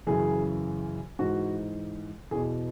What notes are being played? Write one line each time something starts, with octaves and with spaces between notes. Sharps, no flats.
F#2 C#3 E3 G#4
G#2 E3 F#4
E2 B2 G#4